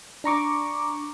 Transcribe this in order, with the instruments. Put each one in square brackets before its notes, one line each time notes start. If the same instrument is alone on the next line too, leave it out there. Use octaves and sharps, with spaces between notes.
[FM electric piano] D4 A#5 C#6 D6